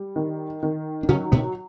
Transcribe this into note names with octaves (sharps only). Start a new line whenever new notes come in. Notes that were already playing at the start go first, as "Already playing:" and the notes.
Already playing: G3
D#3
D#3
D4
C#3 F#3 C#4
B2 B3